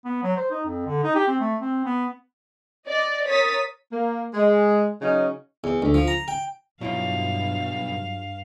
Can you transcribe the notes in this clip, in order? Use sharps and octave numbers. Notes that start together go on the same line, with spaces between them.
B3
F#3
C5
D#4
F2
D3
D#4
G4
C4
A3
C4
B3
D5 D#5
A#4 C#5 D#6 A6 B6
A#3
G#3
C#3 F#3 C#4 D#4
E2
D2
F3
A#5
G5
B1 G2 B2 F#3 E4 F4 F5